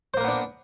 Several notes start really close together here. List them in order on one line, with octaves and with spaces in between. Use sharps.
C5 A#3 A#4 B3 D4